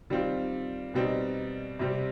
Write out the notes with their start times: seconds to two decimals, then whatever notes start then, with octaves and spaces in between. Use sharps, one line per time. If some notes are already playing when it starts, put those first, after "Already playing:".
0.10 D#3 G3 C4 F4
0.94 B2 G3 C4 D#4
1.79 C3 G3 C4